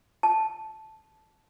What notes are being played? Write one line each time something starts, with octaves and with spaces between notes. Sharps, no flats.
A5